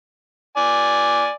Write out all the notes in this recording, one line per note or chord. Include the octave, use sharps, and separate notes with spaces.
D5 G#5